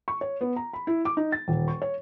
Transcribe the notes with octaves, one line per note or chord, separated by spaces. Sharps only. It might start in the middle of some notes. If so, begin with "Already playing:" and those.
C#6
C#5
B3
A#5
B5
E4
D6
D#4
A6
D#1
C#6
C#5